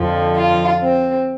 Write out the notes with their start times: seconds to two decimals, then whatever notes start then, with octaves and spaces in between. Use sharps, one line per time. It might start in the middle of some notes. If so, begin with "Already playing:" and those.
Already playing: F2 D3 F3
0.35 F4
0.81 C4